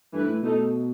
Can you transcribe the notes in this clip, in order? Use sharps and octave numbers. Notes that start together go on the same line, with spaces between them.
G2 E3 A3 E4 B4
A2
B2 A3 D#4 A4